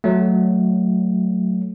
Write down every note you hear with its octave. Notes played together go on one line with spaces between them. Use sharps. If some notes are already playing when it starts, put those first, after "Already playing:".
F#3 A3